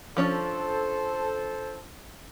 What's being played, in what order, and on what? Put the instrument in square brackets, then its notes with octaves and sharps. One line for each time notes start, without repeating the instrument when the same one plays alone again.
[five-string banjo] F3 C#4 D4 [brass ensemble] A4 C5